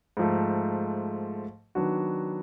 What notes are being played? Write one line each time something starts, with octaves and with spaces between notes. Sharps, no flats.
G#2 F3 A3
D#3 F#3 B3 D4 F#4